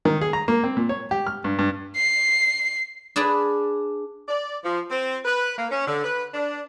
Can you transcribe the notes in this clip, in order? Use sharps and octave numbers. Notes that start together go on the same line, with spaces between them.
D#3
G#4
A#5
A#3
C4
A#2
C#5
G4
F6
G2
G2
C7
D4 G#4 B4 D5
D5
F3
C4
B4
A#3
C#4
D3
B4
D4